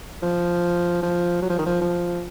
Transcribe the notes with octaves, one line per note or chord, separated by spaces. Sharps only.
F3
F3
F#3
F3
D#3
F3
F3